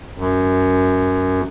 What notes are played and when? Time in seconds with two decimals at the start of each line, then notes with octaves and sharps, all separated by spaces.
0.18 F#2